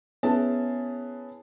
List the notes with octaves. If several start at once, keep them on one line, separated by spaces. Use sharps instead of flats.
B3 C#4 E4 G#4 A5